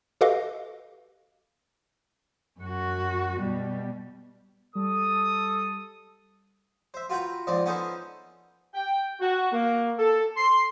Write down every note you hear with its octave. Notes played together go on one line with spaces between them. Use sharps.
F#4 G4 A4 B4 D#5 F5
F#2 F#4
B2 G3
G3 A4 D#6
C5 E5
F4 F#4 B4 G5 A#5
G#2 F3 C4 D5
B3 C#4 D#4 A4 C5
G5
F#4
A#3
A4
C6